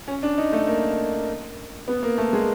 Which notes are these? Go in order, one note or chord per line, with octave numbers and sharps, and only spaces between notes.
C#4
D4
D#4
A3
A#3
B3
A#3
A3
G#3